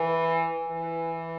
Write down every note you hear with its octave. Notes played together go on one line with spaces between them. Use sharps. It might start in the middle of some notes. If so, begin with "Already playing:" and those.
Already playing: E3
E3